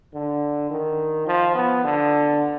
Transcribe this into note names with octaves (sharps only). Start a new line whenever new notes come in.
D3
D#3
F3
B3
D3